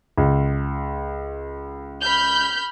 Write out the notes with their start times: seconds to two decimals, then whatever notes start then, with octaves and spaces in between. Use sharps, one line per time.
0.18 C#2
2.02 B5 F6 G6